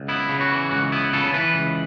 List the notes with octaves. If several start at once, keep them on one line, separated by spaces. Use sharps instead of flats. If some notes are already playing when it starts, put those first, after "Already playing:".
Already playing: C#2
B3 E4
C#3
F#4
E3
C#2 F#4
B3 E4
C#3 A4
E3 B4
C#2